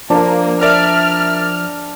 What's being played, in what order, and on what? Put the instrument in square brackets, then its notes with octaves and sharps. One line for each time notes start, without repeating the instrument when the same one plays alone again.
[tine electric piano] F3 [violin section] A#3 [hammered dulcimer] D4
[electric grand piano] A#4 D5 E5 [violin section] F6